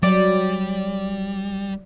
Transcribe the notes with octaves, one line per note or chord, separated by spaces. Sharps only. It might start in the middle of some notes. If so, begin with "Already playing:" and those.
F#3 G3 D5